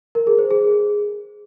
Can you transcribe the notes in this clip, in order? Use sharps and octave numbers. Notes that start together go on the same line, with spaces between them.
A#4
G#4
C5
G#4